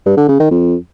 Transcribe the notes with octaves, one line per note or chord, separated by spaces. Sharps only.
G2
D3
C#3
D#3
F2